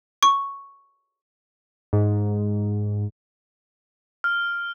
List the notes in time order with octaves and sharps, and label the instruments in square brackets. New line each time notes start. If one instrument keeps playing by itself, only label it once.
[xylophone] C#6
[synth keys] G#2
[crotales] F6